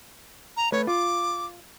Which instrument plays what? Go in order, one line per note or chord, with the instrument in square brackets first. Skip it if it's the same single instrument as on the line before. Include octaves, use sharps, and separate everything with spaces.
[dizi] A#5
[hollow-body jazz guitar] A3 B4 [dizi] C#5
[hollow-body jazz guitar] F4 [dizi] D6